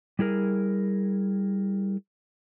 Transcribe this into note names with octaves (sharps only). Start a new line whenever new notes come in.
G3 E4 G#4 A#4